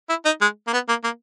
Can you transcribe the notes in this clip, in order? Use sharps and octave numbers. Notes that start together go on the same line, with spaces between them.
E4
D#4
G#3
A#3
B3
A#3
A#3